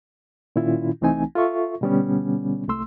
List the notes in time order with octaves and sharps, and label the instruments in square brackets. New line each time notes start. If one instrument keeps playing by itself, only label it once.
[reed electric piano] A#2 D#3 C#4 E4 F4
C2 E3 A3 C4 D#4 G#5
F4 A4 E5 C#6
B2 D3 G3 B3 C#4
C2 A3 C6 E6